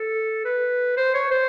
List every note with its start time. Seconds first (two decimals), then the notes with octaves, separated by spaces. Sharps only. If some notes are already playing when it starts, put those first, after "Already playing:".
Already playing: A4
0.45 B4
0.97 C5
1.14 C#5
1.31 C5